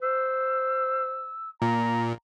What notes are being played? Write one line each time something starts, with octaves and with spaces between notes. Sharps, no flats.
C5 E6
A#2 A#5